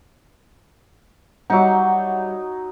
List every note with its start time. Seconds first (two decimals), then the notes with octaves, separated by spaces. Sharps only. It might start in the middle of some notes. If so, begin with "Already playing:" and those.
1.50 F#3 G3 D#4 E5 F#5